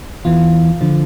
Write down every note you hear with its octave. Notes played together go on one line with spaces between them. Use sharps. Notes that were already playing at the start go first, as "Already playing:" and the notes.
E2 E3 F4
D3 F3